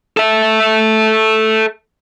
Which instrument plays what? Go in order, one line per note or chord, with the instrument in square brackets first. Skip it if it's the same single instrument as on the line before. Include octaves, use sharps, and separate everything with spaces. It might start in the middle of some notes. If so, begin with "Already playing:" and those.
[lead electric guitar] A4 E5